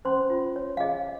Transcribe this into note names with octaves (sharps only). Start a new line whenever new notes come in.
C#4 C5 C6
F4
C#5
F5
G#4 D#5